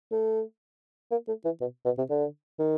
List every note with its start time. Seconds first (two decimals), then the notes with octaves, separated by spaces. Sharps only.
0.11 A3
1.11 A#3
1.28 A3
1.45 E3
1.61 B2
1.85 B2
1.98 C3
2.10 D3
2.59 D#3